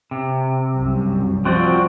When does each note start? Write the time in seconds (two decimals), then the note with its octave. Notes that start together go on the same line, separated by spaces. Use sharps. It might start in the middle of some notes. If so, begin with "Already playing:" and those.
0.11 C3
0.76 C2 F#2
1.45 F3 C4 F#4 D5